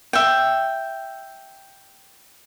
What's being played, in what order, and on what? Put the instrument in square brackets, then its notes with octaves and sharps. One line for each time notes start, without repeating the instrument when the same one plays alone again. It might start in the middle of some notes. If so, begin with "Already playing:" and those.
[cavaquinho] E5 G5